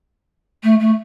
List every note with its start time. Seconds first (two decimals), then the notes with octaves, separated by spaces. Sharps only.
0.63 A3
0.79 A3